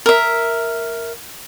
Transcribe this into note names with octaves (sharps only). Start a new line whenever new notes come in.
A#4 E5